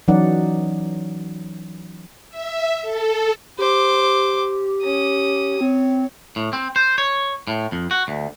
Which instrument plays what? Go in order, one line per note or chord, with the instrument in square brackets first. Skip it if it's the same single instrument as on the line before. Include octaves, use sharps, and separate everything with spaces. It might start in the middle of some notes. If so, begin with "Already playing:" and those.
[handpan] E3 F#3 C#4 D#4 D5 F#5
[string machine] E5
A4
[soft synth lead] G4 [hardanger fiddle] C5 D6
[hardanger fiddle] C#4 D#6
[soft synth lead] C4 [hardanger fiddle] C#5
[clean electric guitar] A2
C4
C5
C#5
A2
F2
F#4
D2